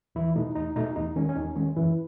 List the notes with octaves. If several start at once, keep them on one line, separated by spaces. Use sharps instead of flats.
E2 E3 E4
B2 A3 D#4
E2 D#4
B2 A3 D#4
E2 D#4
D#3 G#3 C#4
C#4
E2 D#4
D#3 G#3 C#4
F#2 E3 E4